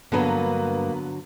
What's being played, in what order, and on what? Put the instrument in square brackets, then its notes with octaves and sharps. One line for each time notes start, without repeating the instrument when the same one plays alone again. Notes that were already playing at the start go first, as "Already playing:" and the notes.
[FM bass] G2 [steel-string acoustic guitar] D3 F#3 [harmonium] A#3 [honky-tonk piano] B3 B4 A#5